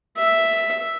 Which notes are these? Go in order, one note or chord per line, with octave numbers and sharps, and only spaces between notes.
E5